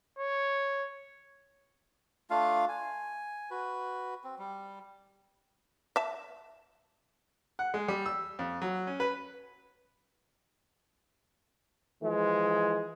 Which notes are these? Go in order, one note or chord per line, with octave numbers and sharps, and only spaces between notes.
C#5
A3 D4 F4 F5
G#5
F#4 B4
C4
G3
E5 A5
F#5
G#3
G3
E6
F2
F#3
C#4
B4
E3 F3 G#3